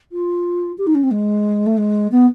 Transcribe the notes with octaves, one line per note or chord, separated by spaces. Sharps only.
F4
G4
D#4
C#4
C4
G#3
A3
G#3
B3